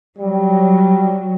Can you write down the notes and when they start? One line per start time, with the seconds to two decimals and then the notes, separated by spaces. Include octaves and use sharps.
0.18 F#3 G3